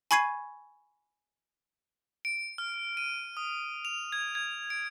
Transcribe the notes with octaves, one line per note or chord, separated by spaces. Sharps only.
G#5 B5 C#6 G#6 C7 D#7
D7
F6
D#7
D#6
F7
G#6
G#6
D7